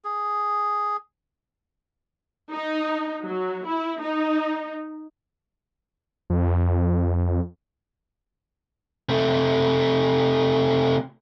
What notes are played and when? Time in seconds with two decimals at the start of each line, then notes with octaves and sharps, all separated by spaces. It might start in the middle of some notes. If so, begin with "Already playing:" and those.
0.04 G#4
2.53 D#4
3.25 F#3
3.66 E4
4.01 D#4
6.30 F2
9.09 C3 A3